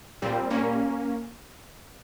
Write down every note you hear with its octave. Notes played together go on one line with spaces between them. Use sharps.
A#2 G3 C4
A#3 C#4